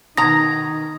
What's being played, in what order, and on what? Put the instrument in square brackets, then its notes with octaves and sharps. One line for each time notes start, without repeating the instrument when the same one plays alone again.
[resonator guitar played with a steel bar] B2 A#5 [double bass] D#3 D#4 [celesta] D#6 G#6 [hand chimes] A#6